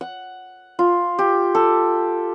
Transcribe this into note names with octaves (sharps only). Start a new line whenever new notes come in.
F#5
F4
G4
A4